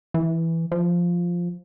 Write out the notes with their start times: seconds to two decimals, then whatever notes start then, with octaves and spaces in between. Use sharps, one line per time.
0.14 E3
0.72 F3